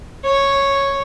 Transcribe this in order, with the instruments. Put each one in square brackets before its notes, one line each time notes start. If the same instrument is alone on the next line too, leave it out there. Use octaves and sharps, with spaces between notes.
[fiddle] C#5